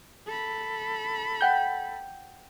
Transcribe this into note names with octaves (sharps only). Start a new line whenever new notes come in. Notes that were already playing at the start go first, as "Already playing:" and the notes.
A4 B5
F#5 G5 G6